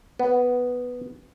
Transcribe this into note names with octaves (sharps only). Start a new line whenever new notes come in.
B3